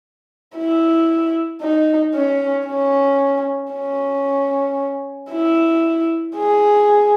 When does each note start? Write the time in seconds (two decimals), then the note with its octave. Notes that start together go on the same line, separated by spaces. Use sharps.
0.57 E4
1.61 D#4
2.15 C#4
2.67 C#4
3.73 C#4
5.31 E4
6.36 G#4